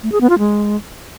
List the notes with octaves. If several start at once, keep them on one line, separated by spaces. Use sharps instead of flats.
A3
G#4
B3
F4
G#3